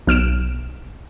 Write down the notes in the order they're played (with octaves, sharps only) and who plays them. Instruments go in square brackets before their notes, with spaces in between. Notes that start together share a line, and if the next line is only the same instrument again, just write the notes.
[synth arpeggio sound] B1 F6 D7 E7